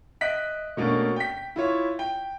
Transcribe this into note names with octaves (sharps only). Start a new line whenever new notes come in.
D#5 E5 F#6 B6 D7
B2 A3 A#3 C#4 D4
G5 B6
E4 F4 C#5
G5